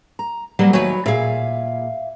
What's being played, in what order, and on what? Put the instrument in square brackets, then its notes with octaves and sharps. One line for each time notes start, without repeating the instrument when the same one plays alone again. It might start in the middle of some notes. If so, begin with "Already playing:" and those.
[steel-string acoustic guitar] A#5
[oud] F#3 A#3 B3 [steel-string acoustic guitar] G3
[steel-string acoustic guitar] D#2 A3 G#5 [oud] F#3 B4
[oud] A#2 G#4 [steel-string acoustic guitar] E5 F5